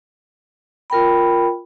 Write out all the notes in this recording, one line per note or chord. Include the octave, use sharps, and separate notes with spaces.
F4 A#4 G5 B5